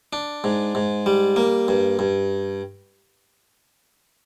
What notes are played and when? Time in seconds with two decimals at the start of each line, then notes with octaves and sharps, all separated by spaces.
0.13 D4
0.44 G#2
0.75 G#2
1.06 G3
1.36 A#3
1.68 G2
1.99 G2